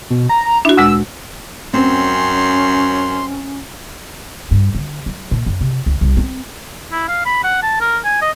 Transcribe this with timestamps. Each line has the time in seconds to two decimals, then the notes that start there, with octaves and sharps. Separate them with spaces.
0.10 B2
0.29 A#5
0.65 D4 E4 F#4
0.77 D2 A#2 G#3 E6
1.73 F#2 C4 C#4 C5 C6
4.51 G2
4.75 D3
5.06 F#3
5.31 A#2
5.46 F#2
5.61 C3
5.86 C#2
6.01 C2
6.17 C4
6.92 E4
7.08 F5
7.26 B5
7.44 F#5
7.63 A5
7.81 A#4
8.05 G#5
8.22 D#5